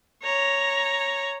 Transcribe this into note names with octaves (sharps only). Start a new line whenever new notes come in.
C#5 A#5